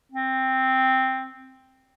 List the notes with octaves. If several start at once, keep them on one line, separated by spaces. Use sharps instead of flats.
C4